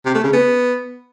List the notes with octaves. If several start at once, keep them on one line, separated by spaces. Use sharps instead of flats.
C3
A3
C#3
B3